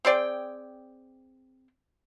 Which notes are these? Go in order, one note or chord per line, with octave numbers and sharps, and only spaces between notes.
C4 G#4 D5 G5